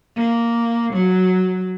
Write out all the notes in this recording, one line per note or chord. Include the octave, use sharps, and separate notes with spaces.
A#3
F#3